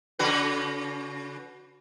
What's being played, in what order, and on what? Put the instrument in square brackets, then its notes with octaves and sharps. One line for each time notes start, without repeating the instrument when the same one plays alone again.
[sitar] C#3 F#4 B4